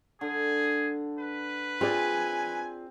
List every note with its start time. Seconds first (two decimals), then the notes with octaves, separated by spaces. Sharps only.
0.21 D3 G#4
1.19 B4
1.81 C4 F4 G#4 D5 G#5